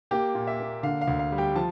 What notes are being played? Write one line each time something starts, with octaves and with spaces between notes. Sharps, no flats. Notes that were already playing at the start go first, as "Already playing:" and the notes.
A#3 G4 G5
A#2
E5
A#3
D3 F5
F5
D2
F5
G3
G4 G5
F3 A5